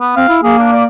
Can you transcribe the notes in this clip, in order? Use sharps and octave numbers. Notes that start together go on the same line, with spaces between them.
B3
C4 F5
E4
A#3 G#4
D4
D5